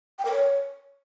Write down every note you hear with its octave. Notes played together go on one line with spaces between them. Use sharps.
G5
A#4
C#5